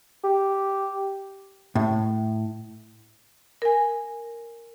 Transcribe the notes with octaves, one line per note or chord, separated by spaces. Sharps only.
G4
A2
A#4 G#5